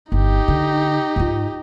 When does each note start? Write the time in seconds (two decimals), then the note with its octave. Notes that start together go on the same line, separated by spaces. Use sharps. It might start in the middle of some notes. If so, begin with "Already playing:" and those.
0.12 G1 D#4 G4
0.48 D3
1.16 G#2 F4